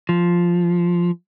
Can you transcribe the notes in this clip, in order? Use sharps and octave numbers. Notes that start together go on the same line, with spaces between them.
F3